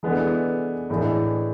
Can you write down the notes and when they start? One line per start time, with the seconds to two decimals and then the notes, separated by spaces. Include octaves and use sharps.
0.03 E3 G#3 B3 D4 A4
0.90 A2 E3 G#3 D4